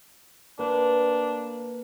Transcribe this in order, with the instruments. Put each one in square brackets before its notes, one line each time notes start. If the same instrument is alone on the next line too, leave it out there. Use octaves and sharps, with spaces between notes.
[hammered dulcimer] A#3 B4 [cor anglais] D4